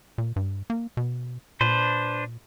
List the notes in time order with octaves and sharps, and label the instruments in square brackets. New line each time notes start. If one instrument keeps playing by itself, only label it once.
[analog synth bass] A#2
G2
A#3
B2
[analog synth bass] A#2 [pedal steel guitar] D4 B4 C5